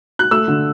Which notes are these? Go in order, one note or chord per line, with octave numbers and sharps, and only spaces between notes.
F#6
A3 E6
D3